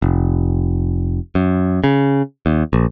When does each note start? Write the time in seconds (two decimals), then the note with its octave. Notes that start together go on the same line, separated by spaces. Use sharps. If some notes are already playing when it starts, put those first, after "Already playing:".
0.02 F1
1.35 F#2
1.84 C#3
2.46 D#2
2.73 A#1